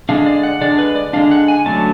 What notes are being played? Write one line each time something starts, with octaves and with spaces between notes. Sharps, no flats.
D3 G#3 D4 F5
D5
F#5
D3 G#3 D4 D5
B4
D5
D3 G#3 D4 F5
F#5
G#5
D3 F#3 A3 C#4 A5